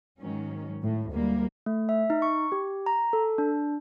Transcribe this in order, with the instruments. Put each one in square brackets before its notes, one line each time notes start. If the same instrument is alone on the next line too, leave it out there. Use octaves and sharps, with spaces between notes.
[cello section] G#2 D#3 F#3 C#4
A2
D2 G3 G#3 A#3
[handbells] A3
E5
D#4
C#6
G4
A#5
A4
D4